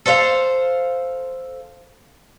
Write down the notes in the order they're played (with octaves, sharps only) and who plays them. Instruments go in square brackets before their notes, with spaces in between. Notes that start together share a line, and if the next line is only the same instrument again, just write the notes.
[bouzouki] A4 C5 E5 F5